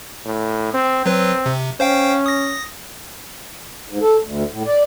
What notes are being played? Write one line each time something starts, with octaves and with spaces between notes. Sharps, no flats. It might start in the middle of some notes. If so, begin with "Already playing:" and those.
A2
C4
F#3 C4 B4
C3
C#4 C5 F5 G5
D#6 A#6
G#2
A4
D2
A2
D5